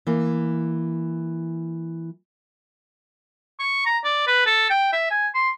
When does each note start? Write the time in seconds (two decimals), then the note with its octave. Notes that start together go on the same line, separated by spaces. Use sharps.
0.07 E3 A#3
3.60 C#6
3.86 A#5
4.04 D5
4.27 B4
4.46 A4
4.70 G5
4.93 E5
5.11 G#5
5.34 C6